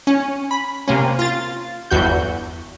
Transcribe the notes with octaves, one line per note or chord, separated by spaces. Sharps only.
C#4
B5
C3 A#3 C#4
F4 A6
G1 E2 F#4 G6